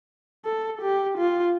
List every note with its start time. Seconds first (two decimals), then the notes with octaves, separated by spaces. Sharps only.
0.45 A4
0.82 G4
1.18 F4